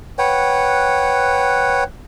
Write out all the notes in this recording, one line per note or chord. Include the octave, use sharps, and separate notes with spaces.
B4 C#5 F#5 G5